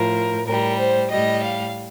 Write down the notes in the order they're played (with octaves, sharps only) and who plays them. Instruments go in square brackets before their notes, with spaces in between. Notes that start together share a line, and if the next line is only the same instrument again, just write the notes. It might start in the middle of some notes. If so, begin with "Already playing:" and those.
Already playing: [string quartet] A2 F3 A#4
A2 G3 A#4
C5
A2 G3 D#5
F5